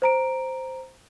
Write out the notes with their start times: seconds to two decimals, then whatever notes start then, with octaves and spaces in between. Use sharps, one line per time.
0.02 C5 A#5 D7